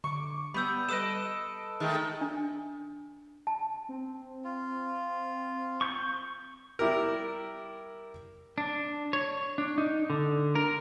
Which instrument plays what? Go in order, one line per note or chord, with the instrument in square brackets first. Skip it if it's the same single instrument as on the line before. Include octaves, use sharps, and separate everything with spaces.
[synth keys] D3 D6 [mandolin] C#6
[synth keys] G3 [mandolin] B3 G6 [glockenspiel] B5 E6
[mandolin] A4 B4 D#5 [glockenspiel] D#6 E7 [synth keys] D7
[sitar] D#3 G#3 A3 [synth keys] G6 A6
[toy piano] D4
A5
[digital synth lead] C4
[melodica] F4
[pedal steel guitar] C#6 G6
[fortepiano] G3 E4 G4 A#4
[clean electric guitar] D4
C#5
D4
D#4
D3
A#4